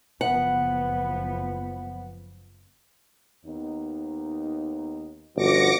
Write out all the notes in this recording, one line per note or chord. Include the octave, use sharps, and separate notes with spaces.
F#1 F3 B3 F#5
D#2 B3 D#4
G1 F3 C#4 F#4 D6 A#6 C#7